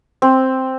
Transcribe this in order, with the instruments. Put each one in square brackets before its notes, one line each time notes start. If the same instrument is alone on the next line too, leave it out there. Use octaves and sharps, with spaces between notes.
[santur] C4